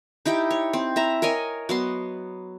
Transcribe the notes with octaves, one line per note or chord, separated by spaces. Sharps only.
D#4 E4 G4 G5
C#5
C4
E4 E5 A#5
A#4 C#5 D#5 G#5
F#3 B3 C6